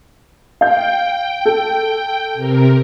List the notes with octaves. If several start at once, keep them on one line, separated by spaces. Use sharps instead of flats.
F5 G5 G6
A4
C3 A#4